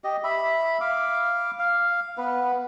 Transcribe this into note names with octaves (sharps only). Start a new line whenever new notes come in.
G4 D#5
E5 B5
F5 D6
F5
B3 B4